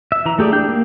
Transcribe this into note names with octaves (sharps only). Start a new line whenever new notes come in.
E5
E3 A#5
A3 G4 G#4 D5
D4 G5 G6
A#3